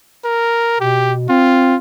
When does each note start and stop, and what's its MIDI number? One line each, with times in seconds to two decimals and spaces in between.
0.25 0.79 70
0.80 1.26 47
0.80 1.13 67
1.29 1.76 60
1.29 1.76 65